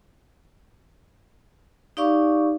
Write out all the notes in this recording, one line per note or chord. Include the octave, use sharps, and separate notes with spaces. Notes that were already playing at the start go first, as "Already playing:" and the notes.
D#4 G4 D5 F5 C#6 D6